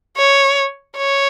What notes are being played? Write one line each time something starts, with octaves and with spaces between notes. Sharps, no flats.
C#5
C#5